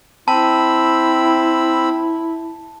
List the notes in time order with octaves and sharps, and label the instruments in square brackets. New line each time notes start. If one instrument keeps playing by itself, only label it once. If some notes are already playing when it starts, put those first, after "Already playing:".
[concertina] C4 B5 E6 [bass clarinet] E4 [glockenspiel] A5